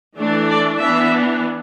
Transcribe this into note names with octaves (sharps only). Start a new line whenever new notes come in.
E3 A3 D4
D5
E3 B3 D4 E5